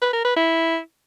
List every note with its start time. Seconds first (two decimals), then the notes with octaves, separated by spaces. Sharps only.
0.02 B4
0.13 A#4
0.25 B4
0.36 E4